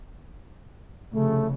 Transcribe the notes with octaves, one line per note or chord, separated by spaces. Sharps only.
F1 C#3 A3